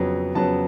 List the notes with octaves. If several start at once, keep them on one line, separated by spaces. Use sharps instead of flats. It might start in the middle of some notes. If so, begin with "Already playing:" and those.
Already playing: F2 C#3 F#3 B3
F2 C#3 F#3 B3 A5